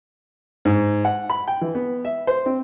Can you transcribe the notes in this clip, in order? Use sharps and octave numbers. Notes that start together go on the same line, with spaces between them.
G#2
F#5
B5
G5
E3
B3
E5
C5
C4